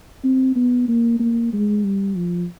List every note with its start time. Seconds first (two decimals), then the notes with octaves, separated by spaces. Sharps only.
0.24 C4
0.56 B3
0.88 A#3
1.19 A#3
1.53 G#3
1.84 G3
2.17 F3